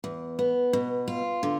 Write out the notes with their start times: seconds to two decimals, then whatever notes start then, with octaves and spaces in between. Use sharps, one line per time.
0.04 E2
0.39 B3
0.73 B2
1.08 F4
1.43 D3